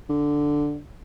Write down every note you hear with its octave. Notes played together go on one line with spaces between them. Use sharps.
D3